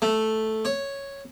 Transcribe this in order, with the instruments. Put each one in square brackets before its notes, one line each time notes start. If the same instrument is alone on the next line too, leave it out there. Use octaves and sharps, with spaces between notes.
[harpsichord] A3
C#5